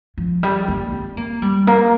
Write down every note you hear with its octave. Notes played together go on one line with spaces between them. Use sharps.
F3
G3
A#3
C4
A#3
G3
A#3